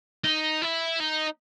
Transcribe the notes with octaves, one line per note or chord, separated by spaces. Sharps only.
D#4
E4
D#4